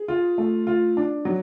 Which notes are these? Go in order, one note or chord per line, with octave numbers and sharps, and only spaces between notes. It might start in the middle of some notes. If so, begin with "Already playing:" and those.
Already playing: G#4
F4
A3
F4
D4
F#3